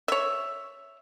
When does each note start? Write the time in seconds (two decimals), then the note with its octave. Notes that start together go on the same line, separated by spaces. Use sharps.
0.08 C#5 E5